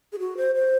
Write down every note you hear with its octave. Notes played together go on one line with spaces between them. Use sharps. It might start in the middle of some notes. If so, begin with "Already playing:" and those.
G#4
F#4
C5
C5